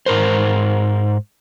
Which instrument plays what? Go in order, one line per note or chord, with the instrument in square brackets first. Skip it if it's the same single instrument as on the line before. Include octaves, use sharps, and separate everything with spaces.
[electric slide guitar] G#2 A#4 C5